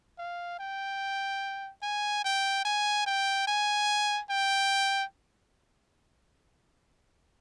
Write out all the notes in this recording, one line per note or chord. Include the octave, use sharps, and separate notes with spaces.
F5
G5
G#5
G5
G#5
G5
G#5
G5